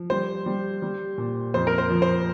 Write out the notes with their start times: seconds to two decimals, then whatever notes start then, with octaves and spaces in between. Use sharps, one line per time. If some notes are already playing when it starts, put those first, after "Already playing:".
Already playing: F3
0.10 G3 C5
0.46 G3
0.82 G3
1.18 A#2
1.54 F2 C5
1.67 A#4
1.78 C5
1.90 F3
2.02 C5